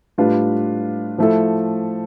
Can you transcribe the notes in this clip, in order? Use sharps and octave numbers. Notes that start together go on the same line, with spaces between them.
A2 G3 D4 F4 B4
F3 A3 E4 A4